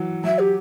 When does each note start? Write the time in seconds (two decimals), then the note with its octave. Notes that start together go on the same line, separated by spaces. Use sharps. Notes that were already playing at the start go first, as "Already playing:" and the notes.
Already playing: E3 F#3
0.24 F#3 E5
0.38 G4